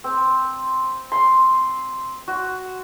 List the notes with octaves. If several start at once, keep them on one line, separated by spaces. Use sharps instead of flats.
C4
C6
F#4